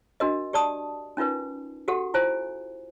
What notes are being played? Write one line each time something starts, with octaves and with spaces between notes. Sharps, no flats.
D4 F#4 A#4 D#5
G4 D5 A5 D#6
C#4 D#4 F4 A#4 B4
F#4 G4 A4 F#5
E4 F4 C5 G#5